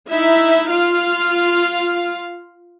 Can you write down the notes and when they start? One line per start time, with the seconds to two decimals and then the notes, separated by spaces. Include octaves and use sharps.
0.10 D#4 E4 E5
0.71 F4 F5